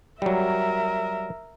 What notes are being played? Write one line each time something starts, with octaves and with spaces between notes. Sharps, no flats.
F#3 G3 A#4 E5